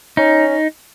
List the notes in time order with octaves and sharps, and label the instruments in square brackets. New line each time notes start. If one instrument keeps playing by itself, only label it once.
[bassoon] C#4 [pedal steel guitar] D#4